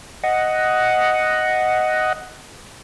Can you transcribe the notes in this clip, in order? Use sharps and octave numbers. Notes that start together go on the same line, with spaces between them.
D#5 F#5